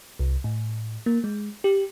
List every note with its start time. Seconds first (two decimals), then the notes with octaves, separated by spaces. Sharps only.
0.19 C2
0.44 A2
1.06 A#3
1.24 G#3
1.64 G4